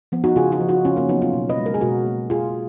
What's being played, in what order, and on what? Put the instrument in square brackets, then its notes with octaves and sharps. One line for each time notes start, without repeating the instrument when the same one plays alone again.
[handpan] F3 B3
D#4 F#4
C#3 F4 G#4
D#4 F#4
F3
D#4 F#4
C#3 C#4 F4
A#3 C#4
F#3 B3 D#4
C#4 F4
B2
B4 D#5
G#3
A#4
G#4
B2 F#4 A#4
A#3
B2 F4 G#4